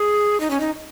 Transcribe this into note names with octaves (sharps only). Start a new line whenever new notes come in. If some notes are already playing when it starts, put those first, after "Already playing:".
Already playing: G#4
D#4
C#4
D#4